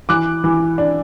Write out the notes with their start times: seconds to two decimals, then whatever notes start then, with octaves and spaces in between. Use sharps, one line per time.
0.09 E3 D6 F#6
0.44 E3
0.78 D4